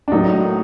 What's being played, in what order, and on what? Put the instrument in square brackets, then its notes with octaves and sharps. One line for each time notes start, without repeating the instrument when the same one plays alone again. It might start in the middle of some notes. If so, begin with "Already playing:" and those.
[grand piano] D4
[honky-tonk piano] A2 F#3 A#3 [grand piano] D#4